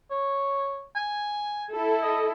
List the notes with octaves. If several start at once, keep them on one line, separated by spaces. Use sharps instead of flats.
C#5
G#5
E4 A4
D#5